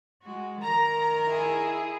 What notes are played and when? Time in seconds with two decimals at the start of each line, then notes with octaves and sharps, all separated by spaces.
0.23 G#3 F#4
0.62 D#3 A#4 A#5
1.26 E4 G#4